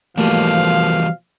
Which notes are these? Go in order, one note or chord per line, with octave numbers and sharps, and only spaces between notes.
B2 E3 F3 G3 A3 A#3 G4 F5